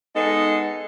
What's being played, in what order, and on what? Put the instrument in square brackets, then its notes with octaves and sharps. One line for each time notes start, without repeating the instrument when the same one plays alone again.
[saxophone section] G#3 B3 D#4 A4